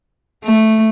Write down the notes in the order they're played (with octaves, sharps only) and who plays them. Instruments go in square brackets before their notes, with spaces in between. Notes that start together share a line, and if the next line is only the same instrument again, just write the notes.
[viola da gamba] A3